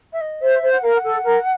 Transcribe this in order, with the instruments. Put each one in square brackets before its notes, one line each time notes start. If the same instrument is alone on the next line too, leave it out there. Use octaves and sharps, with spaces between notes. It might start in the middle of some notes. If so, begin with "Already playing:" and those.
[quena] E5
D#5
[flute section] C5 [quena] E5
[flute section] C5
[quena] F#5
[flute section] A#4 [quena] F5
[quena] F#5
[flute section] A4
A#4